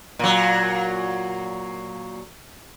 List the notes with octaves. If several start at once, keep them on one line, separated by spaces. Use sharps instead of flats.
A#2 F#3